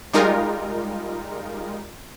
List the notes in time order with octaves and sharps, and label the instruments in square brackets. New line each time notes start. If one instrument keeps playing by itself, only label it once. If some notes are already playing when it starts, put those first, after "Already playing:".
[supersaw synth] G3 G#3 D#4 F4 A#4